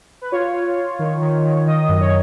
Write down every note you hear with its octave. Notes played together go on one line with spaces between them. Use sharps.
B4
F4 C#5
F4
F4
D#3
D#3
D#3
D#3 D#5
F#2
C#5